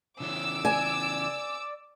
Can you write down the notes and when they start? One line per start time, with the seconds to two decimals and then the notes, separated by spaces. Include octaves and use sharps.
0.20 C#3 E3 C#4 D6 E6
0.65 D5 G#5